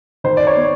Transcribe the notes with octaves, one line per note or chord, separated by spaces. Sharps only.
D#3 C5
D5
C#5
B3